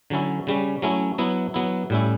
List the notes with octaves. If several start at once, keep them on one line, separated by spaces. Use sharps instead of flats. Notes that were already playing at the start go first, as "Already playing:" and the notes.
D3 F#3 C#4 E4
C#3 G3 C#4
F#3 A3 C#4 E4
F#3 B3 E4
F#3 B3 E4
A2 G3 C#4 E4